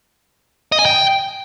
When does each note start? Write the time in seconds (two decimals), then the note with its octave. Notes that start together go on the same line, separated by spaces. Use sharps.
0.72 D#5
0.79 G#5
0.85 G5